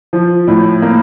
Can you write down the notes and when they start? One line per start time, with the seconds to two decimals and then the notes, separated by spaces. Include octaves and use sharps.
0.13 F3
0.48 A2
0.82 A#3